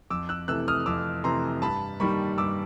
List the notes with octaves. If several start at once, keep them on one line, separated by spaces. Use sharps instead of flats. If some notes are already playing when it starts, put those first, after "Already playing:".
F2 D6 E6
E6 F#6
C3 E3 A3 E6 F#6
D#6 F6
D#6
F2 D6 E6
C3 E3 A3 A#5 C6
G2 A5 B5
D#3 G3 A#3 B5 C#6
G2 D6 E6